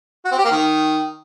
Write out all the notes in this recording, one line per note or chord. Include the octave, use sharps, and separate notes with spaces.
F#4
C4
G4
A#3
D#3